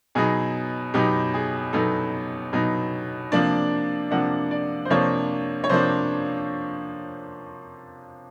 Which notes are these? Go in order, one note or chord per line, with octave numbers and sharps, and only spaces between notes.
B2 F#3 B3 D#4 G#4
B2 F#3 B3 D#4 G4
G#4
B2 F#3 B3 D#4 A4
B2 F#3 B3 D#4
C3 F3 A#3 D4 D5
C3 F3 A#3 D4 F#5
D5
C5
C3 F3 A#3 D4 C#5
C#5
C3 F3 A#3 D4 C5